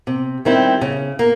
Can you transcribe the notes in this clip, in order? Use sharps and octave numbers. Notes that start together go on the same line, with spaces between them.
C3
D#3 G3 C4 E4
C#3
A#3